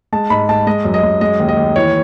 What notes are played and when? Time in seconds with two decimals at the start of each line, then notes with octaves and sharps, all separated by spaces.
0.13 G#3 A5
0.30 G#2 B5
0.48 G#2 A5
0.67 G#3 D#5
0.85 F#2
0.94 D#5
1.03 F#2
1.21 G#3 D#5
1.40 D#2
1.49 D#5
1.57 D#2
1.76 E3 C#5